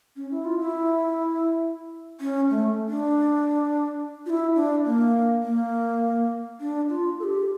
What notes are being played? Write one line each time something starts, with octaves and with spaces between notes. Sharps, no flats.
C#4
E4
F4
E4
C#4
A3
D4
F4
E4
D4
A#3
A#3
D4
F4
A4
G4